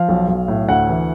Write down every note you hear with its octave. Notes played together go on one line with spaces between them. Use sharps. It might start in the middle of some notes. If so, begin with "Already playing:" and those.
Already playing: F3 F5
B1
B1
A2
D2 F#5
E3